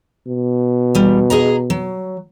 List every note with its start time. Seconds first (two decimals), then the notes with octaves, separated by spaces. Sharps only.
0.28 B2
0.95 E2 G3
1.30 G#4 D#5 A#5
1.70 F#3